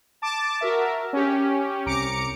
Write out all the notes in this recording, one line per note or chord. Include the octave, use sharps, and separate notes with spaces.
A5 D6
F#4 A#4 E5
C#4 G4
C2 A#5 D6 C#7 D7